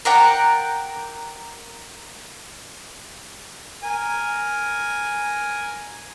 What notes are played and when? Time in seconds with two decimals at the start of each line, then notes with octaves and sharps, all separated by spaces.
0.05 A#4 D5 F#5 G5
3.84 A#4 G#5